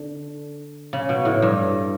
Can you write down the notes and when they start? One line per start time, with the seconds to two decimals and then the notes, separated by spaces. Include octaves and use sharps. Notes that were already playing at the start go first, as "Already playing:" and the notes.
Already playing: D3
0.93 C#3
1.09 B2
1.25 A2
1.42 G2